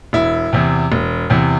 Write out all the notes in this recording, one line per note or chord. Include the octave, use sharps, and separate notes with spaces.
E1 E4
E2 C3
E1
E2 C3